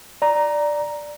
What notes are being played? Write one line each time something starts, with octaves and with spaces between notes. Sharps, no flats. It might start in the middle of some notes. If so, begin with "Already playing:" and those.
D5 A#5